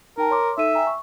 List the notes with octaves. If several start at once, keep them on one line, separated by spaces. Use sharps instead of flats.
D#4 A#4 G5 A5
C#5 C6 D6
D#4 A4 E5 D#7
G5 G#5 A#5
C#6